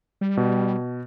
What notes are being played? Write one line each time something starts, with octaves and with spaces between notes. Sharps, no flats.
G3
B2